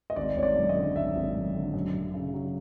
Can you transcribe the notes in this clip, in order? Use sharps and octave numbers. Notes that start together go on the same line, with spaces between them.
D#5
G#1 D5
G#1 C#5
D5
F#2
D#5
D3
G#1 E5
G#1
F#2
D3
F#2
F#2
C#3
F#3